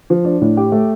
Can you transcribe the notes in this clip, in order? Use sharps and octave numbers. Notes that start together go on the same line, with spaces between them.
F3
D4
A2
G4
A3